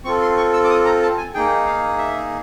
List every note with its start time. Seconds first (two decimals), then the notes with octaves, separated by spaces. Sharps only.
0.05 C4 F4 A4 C#6
0.22 C6
0.37 C#6
0.53 E6
0.64 D6
0.70 D#6
0.85 A#5
1.02 A5
1.17 G#5
1.34 A#3 D#4 G#4 G5
1.66 F5
1.98 E5